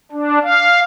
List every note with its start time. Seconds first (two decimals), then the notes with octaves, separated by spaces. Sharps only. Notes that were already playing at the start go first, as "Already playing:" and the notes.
0.12 D4
0.43 F5